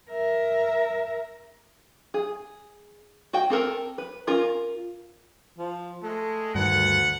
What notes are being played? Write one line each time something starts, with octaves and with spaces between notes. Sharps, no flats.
A#4 E5
G#4
F#4 G5
C4 A4 A#4 A5
B4
C#4 F4 A#4
F3
G#3 A3
D2 G2 D#3 F#5